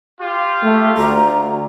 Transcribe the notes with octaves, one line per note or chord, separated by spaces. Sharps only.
F4 G4
A3
D2 A#5